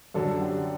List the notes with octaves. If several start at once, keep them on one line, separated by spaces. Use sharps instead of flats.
F#2 D3 F#3 A4
G4